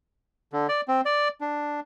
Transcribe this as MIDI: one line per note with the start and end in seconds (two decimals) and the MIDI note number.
0.53 0.67 50
0.69 0.81 74
0.88 1.01 60
1.05 1.28 74
1.41 1.80 62